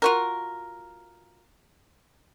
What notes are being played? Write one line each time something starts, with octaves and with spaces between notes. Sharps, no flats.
F4 F#4 A#4